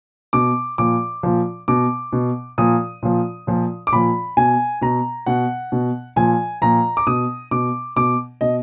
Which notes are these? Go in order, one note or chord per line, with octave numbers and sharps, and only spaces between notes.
B2 D6
A#2 F3 D6
A#2 F3
B2 D6
B2
A#2 F3 D#6
A#2 F3
A#2 F3
D6
A#2 F3 B5
B2 G#5
B2 A#5
B2 F#5
B2
A#2 F3 G#5
A#2 F3 A#5
D6
B2 D#6
B2 D6
B2 D6
B2 D#5